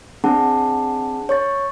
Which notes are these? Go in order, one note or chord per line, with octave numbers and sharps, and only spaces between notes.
C4 D4 G#4 F#5 A5
C#5 C#6 A6